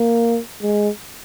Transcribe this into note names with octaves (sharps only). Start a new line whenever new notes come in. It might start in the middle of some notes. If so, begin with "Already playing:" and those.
Already playing: A#3
G#3